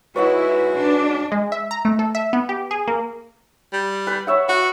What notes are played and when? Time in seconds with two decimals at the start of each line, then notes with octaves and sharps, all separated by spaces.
0.16 G#3 D#4 E4 F#4 B4 C#5 D#5 F#5
0.74 D4
1.32 G#3
1.52 E5
1.71 A#5
1.85 A3
1.99 A4
2.15 E5
2.33 B3
2.49 G4
2.71 G#4
2.88 A#3
3.73 G3
4.07 B4
4.27 C#5 E5 F#5
4.49 F#4 F#5